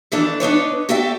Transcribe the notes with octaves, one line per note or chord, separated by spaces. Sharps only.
D#3 E3 D4 A4
D4 D#4 B4 C#5
F#4 G4 A4 D5 E5 G5